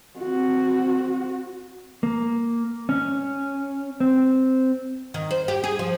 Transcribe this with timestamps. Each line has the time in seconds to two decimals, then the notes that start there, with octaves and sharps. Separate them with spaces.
0.19 C4 F#4
2.03 A#3
2.89 C#4
4.00 C4
5.14 D#3
5.31 C5
5.48 G4
5.64 G#4
5.79 F3